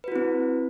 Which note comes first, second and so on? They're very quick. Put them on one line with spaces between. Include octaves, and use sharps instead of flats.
B4 F#4 E4 C4